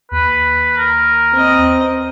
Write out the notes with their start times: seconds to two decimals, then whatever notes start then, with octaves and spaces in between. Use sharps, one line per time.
0.11 D#2 B4
0.78 A#4
1.32 C4 D#5